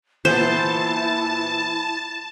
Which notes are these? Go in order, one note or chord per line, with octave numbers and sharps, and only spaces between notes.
A#2 E3 B3 E4 C5 A5